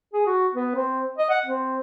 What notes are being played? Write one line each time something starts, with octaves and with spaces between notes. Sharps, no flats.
G#4
F#4
B3
C4
D#5
F#5
C4